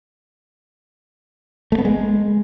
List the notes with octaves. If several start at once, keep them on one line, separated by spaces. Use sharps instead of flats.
A3
B3
G#3